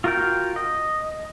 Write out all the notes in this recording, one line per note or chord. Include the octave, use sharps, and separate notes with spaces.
F4 F#4 A#4 F5 G5
D#5